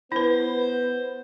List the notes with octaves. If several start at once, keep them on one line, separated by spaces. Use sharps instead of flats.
B3 E4 B4 C5